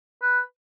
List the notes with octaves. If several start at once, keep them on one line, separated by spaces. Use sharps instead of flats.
B4